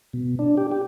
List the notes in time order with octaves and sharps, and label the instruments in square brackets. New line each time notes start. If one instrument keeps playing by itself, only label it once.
[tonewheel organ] B2
D4
G4
G4